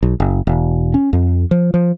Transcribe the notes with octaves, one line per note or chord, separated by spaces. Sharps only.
B1
F#1
E1
C#4
F2
F3
F3